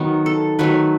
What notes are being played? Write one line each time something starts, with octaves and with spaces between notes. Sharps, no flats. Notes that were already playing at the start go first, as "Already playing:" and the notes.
Already playing: D#3 F#3 B3
A4
D#3 F#3 A3 B4